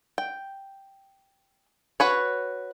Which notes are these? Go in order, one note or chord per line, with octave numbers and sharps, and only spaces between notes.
G5
F#4 B4 C#5